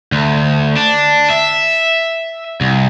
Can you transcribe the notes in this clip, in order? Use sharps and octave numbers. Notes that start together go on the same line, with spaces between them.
D2
D4
E5
C2